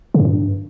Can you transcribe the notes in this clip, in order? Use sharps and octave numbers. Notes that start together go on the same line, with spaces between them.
C#3
F#2
G2